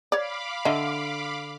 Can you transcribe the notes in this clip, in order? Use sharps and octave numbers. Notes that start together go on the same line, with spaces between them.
C#5 D5 F5 B5 D6
D3 D#5 E5